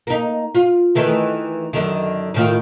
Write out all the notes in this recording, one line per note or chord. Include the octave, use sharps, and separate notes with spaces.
A#3 D#4
F4
D#3 E3 A3
F#2 D3 D#3
A2 D#3 F4